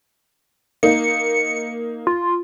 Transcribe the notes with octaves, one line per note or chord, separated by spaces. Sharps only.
A#3 D#4 C#7
F4